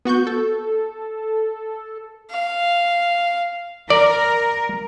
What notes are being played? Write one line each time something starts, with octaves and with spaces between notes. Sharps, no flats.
B3 F#4 C#6 G6
A4
F5
A#4 D5